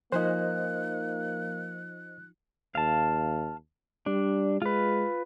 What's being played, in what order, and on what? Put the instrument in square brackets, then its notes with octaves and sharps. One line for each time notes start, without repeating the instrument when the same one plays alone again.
[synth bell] F3 D#4 F4 [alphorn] A#3 [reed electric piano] C5 D#5 [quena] F#6
[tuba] D#2 [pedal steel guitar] F5 A5
[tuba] G3 [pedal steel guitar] D4
[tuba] G#3 [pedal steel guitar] F4 B4